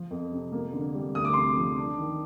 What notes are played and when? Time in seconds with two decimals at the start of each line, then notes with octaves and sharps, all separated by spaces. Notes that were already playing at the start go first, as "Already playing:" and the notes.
Already playing: F3
0.11 F2
0.32 C3
0.52 A#3
0.73 D3
0.94 G3
1.15 D2 D#6
1.25 D6
1.34 C3 C6
1.43 D6
1.57 F3
1.78 D4
1.98 D#3